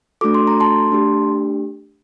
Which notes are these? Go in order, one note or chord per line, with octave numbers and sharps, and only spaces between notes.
A3 D4 F#4 A4 D6
C6
A#5
A5 C6
A3 D4 G4